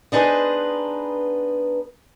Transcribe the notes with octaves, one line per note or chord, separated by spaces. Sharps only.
B3 D4 D#4 G#4 B4 C5